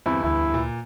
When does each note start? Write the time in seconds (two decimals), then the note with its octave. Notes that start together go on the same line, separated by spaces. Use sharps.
0.06 E2 G2 D3 C4 E4
0.24 D2 E4
0.54 A#2